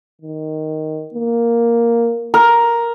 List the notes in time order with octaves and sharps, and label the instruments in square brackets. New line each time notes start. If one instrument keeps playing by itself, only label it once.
[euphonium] D#3
A#3
[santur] A#4